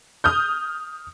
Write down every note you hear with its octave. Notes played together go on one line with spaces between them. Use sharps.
D#6 F6 G6